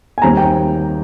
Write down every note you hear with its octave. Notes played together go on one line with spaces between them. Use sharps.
G#5
D#2 D#3 G3 C4 A#5
G5